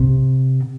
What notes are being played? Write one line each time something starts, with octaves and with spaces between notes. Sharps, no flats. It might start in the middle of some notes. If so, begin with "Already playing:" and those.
Already playing: C3